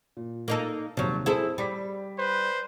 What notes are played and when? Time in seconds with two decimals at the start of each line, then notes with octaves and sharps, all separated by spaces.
0.17 A#2
0.48 A#3 D#4 A4
0.97 D#2 G#2 C3 F3 F#3
1.26 C4 E4 G#4 A4 C5
1.58 G3 B5 D6 B6
2.18 B4 C5